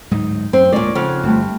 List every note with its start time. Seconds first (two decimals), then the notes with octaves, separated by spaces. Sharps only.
0.11 D1 G#2 F#3 D#4
0.53 F#2 C4
0.72 D2 A#2 G#3 C#5 D5 G#5 D6
0.95 F2 C#3 F#5 F6
1.23 G1 G3 A3 C4